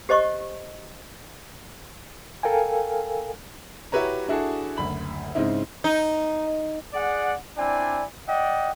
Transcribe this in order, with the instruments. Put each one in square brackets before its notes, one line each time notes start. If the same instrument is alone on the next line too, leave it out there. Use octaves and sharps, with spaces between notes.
[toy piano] G4 C5 D#5 C#6
[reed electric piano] A4 A#4 F5 G5 G#5
[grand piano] E4 F#4 G4 B4 C#5 A#5
D4 E4 F#4 G#4 A4
F#1 D2 B5 F#7
G#2 C#3 C4 D#4 E4
[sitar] D#4
[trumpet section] G#4 D5 F#5
C4 D4 E4 D5 G#5
D5 D#5 F#5 G5